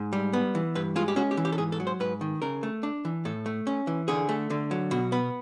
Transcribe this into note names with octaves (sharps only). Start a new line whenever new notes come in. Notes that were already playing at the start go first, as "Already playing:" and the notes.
Already playing: G#2
G3
B3
E3
G2 B4
G#3 F4
G4
C#4 F#4
G4
E3
G4
A4
G#2 G#4
A4
F#3
C5
G#2 B4
D#3
C#3 A#4
A3
D4
E3
A2 A4
A3
C#4
E3
D3 G#4
A3
D3
F#3
B2 F#4
B3